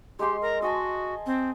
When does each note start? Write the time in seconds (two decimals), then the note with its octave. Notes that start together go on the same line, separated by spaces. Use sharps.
0.19 G#3 G4 C6
0.41 A#4
0.62 F#4 D#5 G#5 A5
1.26 C4